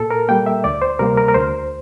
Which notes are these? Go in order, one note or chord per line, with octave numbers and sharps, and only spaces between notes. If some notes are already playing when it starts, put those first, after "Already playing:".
Already playing: A#2 A4
A#4
G3 A#3 G5
E5
D2 D5
C5
C3 G3 A#3 A#4
A#4
A#4
D2 C5